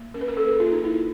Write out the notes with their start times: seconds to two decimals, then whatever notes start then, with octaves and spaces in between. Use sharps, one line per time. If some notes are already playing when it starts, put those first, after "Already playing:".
Already playing: A#3
0.14 C#4 A#4
0.21 B4
0.28 A#4
0.37 A#3 A4
0.48 G#4
0.60 A#3 F4
0.72 D#4
0.84 A#3 E4